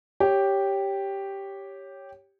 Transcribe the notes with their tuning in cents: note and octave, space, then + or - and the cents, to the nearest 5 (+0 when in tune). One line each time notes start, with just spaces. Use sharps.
G4 +0 C#5 +0